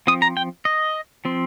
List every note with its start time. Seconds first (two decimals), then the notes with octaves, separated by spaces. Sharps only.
0.07 F3 C4 D#6
0.22 A#5
0.37 G5
0.65 D#5
1.25 F3 C4